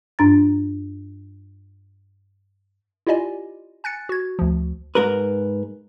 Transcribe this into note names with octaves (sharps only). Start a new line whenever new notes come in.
G2 D4 A#5 A6
E4 F4 G4 D5 D#5 G#5
G#5 F#6 A6 C#7
F#4 G#6
D2 F3
G#2 A#4 B4